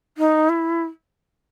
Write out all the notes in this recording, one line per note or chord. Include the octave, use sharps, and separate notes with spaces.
D#4
E4